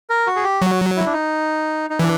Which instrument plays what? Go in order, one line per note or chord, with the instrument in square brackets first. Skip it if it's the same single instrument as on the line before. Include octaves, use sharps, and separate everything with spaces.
[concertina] A#4
F#4
G#4
G4
[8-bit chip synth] F#3 [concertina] F#4
[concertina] E4
D4
D#4
D#4
[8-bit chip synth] E3 [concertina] D4